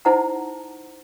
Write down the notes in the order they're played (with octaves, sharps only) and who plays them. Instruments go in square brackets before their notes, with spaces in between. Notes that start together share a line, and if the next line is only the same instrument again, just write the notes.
[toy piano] D#4 E4 C5 F#5 A5 A#5